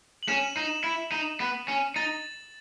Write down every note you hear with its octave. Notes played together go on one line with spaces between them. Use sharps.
F#7
C#4 E7
D#4
E4
D#4
B3
C#4
D#4 A6